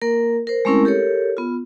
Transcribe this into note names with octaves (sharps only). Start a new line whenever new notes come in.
A#3 A#4
A#4 C5
G#3 A3 C4 C#4 E4 A#4
G4 A4 A#4 C#5
B3 F4